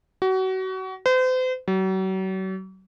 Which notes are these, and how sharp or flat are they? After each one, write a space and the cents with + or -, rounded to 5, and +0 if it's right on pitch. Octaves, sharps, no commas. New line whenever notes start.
F#4 +30
C5 -40
F#3 +40